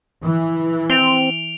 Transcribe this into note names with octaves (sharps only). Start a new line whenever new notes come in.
E3
C4 D7 F7 G7